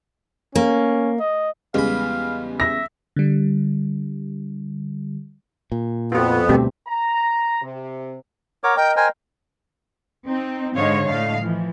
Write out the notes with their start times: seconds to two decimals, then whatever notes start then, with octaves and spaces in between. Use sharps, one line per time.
0.55 A#3 C#4
1.19 D#5
1.74 E2 C#3 G3 G#3 F5 B5
2.60 E5 A#6
3.16 D3 G3
5.72 A#2
6.12 F2 B3 F4 F#4
6.49 D2 B2 G3 A3 C4 G4
6.87 A#5
7.62 C3
8.64 A#4 C#5 F#5 D6
8.76 A#4 D#5 G5
8.96 A#4 C5 G5 G#5
10.26 C4 D#4
10.75 G#2 D3 C5 C#5 D#5 F5
11.05 A2 D3 A3 D#5 F5
11.40 E3 F3